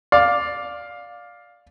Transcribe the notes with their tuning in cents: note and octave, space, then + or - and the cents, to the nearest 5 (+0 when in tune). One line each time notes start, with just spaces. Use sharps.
D5 +0 F5 +10